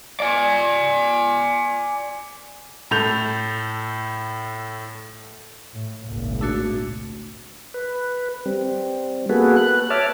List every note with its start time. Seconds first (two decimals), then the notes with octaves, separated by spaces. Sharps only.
0.20 D5 G#5
2.91 A2 A4 G6 F7
5.72 A2
6.05 G#1 C#2 A#2
6.41 A3 D4 F#4
7.74 B4
8.46 G3 C4
9.29 A#3 B3 F#4 G#4 A4 B4
9.56 B4 F#6
9.90 C#5 E5 A5 D6 F6